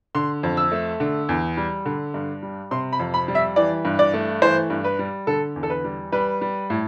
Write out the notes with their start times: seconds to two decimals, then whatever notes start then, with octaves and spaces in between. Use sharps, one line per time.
0.15 D3 C6
0.43 F2
0.57 E6
0.72 A3
1.00 D3
1.29 E2
1.57 G3
1.86 D3
2.14 G2
2.43 G3
2.71 C3 C6
2.92 B5
3.00 F2
3.14 B5
3.28 G3
3.35 E5
3.56 E3 D5
3.85 G2
3.99 D5
4.14 A3
4.42 E3 C5
4.70 G2
4.84 B4
4.99 G3
5.27 D3 A4
5.56 E2
5.63 A4
5.70 B4
5.84 G3
6.12 G3 B4
6.41 G3
6.70 A2